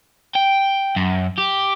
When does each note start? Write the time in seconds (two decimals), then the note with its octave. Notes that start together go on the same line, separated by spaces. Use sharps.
0.35 G5
0.96 F#2
1.38 G4